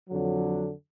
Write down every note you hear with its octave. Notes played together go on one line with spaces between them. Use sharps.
F2 D3 F#3